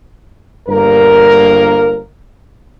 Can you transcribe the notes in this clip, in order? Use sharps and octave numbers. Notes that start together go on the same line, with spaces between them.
G1 G2 A#3 A#4